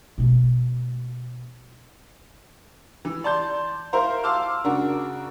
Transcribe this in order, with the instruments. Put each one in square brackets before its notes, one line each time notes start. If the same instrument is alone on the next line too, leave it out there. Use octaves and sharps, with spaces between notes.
[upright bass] B2 A3
[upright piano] E3
D5 A5 C6 G6
E4 A#4 C5 F5 A#5 C6
F5 A5 C6 D6 E6 F6
C#3 D4 F#4 A#4